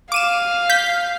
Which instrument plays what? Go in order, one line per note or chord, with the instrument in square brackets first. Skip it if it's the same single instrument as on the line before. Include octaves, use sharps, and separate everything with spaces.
[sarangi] F5 [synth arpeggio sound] D6 D#7 E7
[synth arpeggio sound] G6 B6